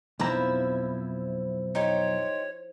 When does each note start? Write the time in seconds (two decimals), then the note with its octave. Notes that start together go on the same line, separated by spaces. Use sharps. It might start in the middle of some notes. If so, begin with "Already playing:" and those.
0.19 B1 F2 F3 E4 A#5
1.75 D#4 G4 C5 C#5